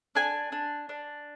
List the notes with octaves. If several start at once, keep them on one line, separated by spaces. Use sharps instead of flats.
D4 G#5
D4
D4